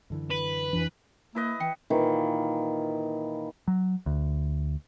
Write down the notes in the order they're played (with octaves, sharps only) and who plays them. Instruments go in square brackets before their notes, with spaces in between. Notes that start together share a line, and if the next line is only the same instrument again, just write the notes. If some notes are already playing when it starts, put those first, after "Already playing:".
[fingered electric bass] F#2 D3 E3
[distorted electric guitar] B4
[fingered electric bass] F2 D4 [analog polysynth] E3
[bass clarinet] A#3 [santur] E4 B4 D#5
[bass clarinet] E3 [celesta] G5 C#7
[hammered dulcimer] A#2 D#3 E3
[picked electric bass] F#3
D2